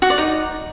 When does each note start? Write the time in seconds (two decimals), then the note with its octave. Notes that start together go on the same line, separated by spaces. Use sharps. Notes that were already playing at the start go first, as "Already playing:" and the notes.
0.02 F#4
0.10 D5
0.18 D#4